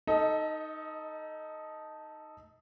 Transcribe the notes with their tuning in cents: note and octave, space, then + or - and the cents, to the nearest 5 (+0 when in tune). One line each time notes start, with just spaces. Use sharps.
D#4 +0 A4 +0 D#5 +30